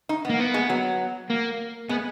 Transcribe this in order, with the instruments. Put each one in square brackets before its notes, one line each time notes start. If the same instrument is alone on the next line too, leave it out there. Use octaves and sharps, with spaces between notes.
[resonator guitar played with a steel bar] D#4
B3
[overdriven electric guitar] A#3
B3
[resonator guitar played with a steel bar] G#3
F#3
[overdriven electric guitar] A#3
[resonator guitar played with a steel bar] G#3 [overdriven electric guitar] B3